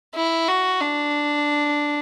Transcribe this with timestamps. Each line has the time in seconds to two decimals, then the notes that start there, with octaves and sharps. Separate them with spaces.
0.15 E4
0.48 F#4
0.80 D4